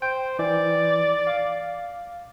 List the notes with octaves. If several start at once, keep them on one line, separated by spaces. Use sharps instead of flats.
C5 G5
E3 D5
F5 D6